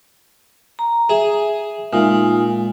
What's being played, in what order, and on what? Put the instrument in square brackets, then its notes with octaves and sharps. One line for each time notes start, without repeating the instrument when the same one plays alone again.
[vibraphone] A#5
[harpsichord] G#4 [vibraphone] E5
[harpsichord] A#2 [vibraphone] G#3 D#4 F4